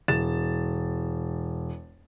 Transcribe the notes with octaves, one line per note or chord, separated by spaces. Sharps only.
E1 A6 E7